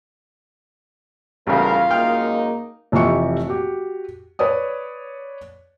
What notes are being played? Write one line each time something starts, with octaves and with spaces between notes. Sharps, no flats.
A1 C#3 G3 B3 F4 A#4 F5
F#2 G#3 A#3 D#4 G5 F6
F1 E3 F4 G4 C#6 C#7
F#4 G4
B4 C#5 D5 D#6